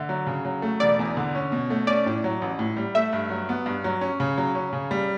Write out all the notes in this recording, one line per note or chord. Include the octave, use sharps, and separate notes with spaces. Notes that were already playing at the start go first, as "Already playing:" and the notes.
Already playing: D3 E5
F#3
C#3
F#3
A3
E1 D5
E2
D3
C#4
B2
A3
C#4 D5
A2
F#3
A1
A2
G3
A3 E5
G2
F#3
B3
G2
F#3
C#4
C#3
F#3
C#4
C#3
G3